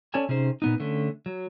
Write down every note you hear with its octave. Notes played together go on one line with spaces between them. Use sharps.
C#4 A4 C#5 D5 G#5 A5
C3 C#4 D#4 G#4 C5
A#2 B3 D#4
D3 A3 C#4
F#3